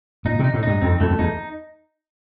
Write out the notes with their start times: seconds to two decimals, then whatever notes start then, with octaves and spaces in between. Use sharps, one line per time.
0.25 A#2 D#4
0.39 C3
0.44 D#4
0.54 A2
0.63 G2 D#4
0.81 F2 C4
1.00 F2 A3
1.11 F2
1.19 E2 D#4